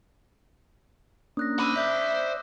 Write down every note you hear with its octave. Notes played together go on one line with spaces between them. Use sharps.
A#3 C#4 D4 D#6 F#6 A#6
C5 B5 D6 E6
D5 E5 D6 G6 B6